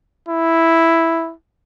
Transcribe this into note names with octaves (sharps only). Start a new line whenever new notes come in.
E4